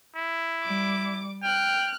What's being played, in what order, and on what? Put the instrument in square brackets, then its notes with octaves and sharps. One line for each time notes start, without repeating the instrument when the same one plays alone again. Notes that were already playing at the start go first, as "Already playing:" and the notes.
[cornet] E4
[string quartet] G3 D6
[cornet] G5 [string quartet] F6 F#6